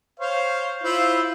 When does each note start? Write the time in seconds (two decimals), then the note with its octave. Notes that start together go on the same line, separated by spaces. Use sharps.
0.19 C5 C#5 F5
0.83 E4 F4 C5